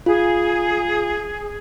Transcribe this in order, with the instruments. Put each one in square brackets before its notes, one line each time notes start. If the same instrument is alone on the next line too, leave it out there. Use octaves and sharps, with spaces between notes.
[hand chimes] F4 [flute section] G#4